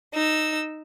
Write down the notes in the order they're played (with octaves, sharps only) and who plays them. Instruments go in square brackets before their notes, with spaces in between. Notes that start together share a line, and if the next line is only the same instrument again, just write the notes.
[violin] D#4 E6